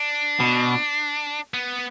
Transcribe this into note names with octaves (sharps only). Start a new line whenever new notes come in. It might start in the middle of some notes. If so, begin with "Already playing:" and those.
Already playing: D4
B2
B3